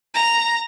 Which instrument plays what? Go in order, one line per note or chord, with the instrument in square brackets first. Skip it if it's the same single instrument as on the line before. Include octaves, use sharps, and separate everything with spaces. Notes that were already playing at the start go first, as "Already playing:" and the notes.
[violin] A#5